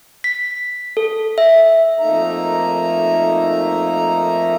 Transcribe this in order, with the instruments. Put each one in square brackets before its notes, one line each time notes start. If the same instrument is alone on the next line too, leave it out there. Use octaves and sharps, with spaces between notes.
[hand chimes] B6
A4
E5
[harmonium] F2 A3 A#3 D#4 E5 A#5